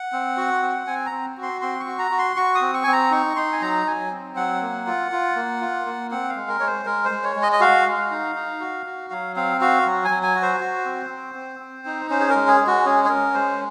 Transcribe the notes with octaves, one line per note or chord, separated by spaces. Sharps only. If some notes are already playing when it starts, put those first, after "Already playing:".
Already playing: F#5
C4
F#4
C4
C4 G#5
A#5
C4
F#4
C6
C4 C6
C#6
F#4
A#5
F#4
C6
F#4 C#6
D#6
C4
C#6
C4 G#5
A#5
D#4 C#6
D#4 C6
G#5
F#3 A#5
F#3 G#5
C4
F#3 F#5
A#3
F4
F4
A#3
F4
A#3
C4 F#5
F5
G#3
A#4
G#3 C#5
C5
G#3 A#4
C5
G#3
C#5
G#3
D#5
D#5
F#4 F5
G#3
D#4
D#4
F#4
F#4
F#3 F5
C4 F5
F#4 F5
F#3
G#5
F#3
G#5
F#4
C5
F#4
C4
C4
C4
C4
D#4
C#4 C5
G#4
A#4
G#3
G#4
G#3
F#4
C#4 G#4
G#4
C#4 A#4
G#3 C5